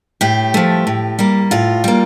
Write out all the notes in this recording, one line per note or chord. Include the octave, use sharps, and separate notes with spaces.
A2 G4
F3 A3
A2
G3 A#3
A2 F4
G3 A#3